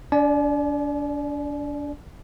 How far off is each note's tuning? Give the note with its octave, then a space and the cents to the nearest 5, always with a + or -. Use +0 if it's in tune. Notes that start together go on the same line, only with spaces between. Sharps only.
D4 -30 D5 +10 G#5 +45